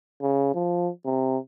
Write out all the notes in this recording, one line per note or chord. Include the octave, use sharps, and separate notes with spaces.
C#3
F3
C3